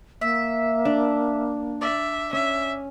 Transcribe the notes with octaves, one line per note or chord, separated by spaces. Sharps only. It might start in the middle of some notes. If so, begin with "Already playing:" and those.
A#3 E5
D4
D5 E5
C#4 E5